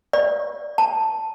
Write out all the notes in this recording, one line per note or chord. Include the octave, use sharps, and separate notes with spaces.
D5
A5